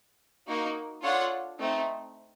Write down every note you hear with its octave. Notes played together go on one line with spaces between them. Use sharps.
A#3 D#4 F#4
D4 F4 A4 C#5 F#5
A3 C4 D#4